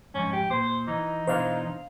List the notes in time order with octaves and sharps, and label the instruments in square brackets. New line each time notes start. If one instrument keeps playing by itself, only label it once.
[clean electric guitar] F2 G#2 [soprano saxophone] C#4
[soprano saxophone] G4
[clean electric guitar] A#2 [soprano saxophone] C5
[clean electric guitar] E3 [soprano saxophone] D#4
[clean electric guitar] B2 E3 D4 [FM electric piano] C5 F5